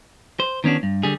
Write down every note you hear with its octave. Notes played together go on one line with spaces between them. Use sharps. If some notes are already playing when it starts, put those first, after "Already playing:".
C5
D#3 B3 C#4 D4 F#4
G2
D3 G3 G#4